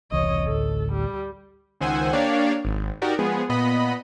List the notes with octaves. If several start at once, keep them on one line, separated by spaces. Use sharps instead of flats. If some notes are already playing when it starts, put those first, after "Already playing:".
E1 C2 E3 C#5 D#5
A1 D2 A4
G3
C#2 D#3 C5 F#5 G#5 E6
A#3 D4 G4 C#5 D5 F5
G#1
D#4 F#4 G4 A#4 D5
F3 G#3 B3 G#4
A#2 B3 D#5 B5